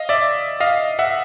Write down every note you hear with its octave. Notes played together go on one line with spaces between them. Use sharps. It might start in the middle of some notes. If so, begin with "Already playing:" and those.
Already playing: D#5 F5
D5 E5
D#5 F5
E5 F#5